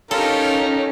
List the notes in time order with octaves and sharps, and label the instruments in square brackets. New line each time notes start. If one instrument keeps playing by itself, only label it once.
[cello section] C#4 [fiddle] D#4 G4 [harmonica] F4 A#4 [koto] A4